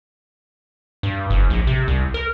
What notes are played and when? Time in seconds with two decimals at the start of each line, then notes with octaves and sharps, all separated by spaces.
1.03 G2
1.30 F#1
1.50 A#1
1.67 C3
1.88 C2
2.14 A#4